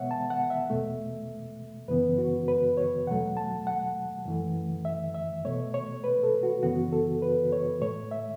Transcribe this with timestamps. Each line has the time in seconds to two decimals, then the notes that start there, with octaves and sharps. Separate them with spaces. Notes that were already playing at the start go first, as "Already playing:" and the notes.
Already playing: B2 B3 C#5 E5 F#5
0.11 A5
0.30 F#5
0.50 E5
0.70 E2 B2 A3
1.88 F#2 C#3 E3 B3 B4
2.18 F#4
2.48 B4
2.77 C#5
3.07 E2 B2 F#3 A3 F#5
3.37 A5
3.67 F#5
4.26 F#2 E3 A3
4.85 E5
5.14 E5
5.45 B2 A3 C#5
5.74 C#5
6.04 B4
6.23 A4
6.43 F#4
6.63 F#2 C#3 E3 B3 F#4
6.92 A4
7.22 B4
7.52 C#5
7.81 A2 A3 C#5
8.11 E5